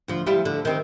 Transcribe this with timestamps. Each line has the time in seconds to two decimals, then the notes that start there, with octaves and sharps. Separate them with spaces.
0.08 D2 F3
0.26 F3 G3 E4
0.45 D3
0.65 D#3 C4